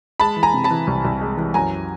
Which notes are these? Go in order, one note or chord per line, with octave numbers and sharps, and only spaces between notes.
G#3 A5 B5
E3
G#5 A#5
C3
A5 B5
E3
C2
C2
G#3
E3
F#2 G#5 A#5